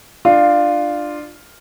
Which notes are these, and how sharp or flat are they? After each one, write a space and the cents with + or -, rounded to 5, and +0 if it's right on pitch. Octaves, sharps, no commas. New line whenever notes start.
D4 +20 F4 +0